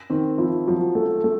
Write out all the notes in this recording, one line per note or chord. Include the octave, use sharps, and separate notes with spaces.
D#3 C4
F3 E4
F3 F#3
A3
A3